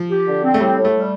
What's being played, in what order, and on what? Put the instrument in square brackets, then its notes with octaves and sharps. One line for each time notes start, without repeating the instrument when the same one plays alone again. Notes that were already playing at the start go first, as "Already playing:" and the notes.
Already playing: [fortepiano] F3
[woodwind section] G4
D3
C4
[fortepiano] A3
[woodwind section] A2 [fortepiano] G3
[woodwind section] A2
[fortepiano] A3
[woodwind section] G3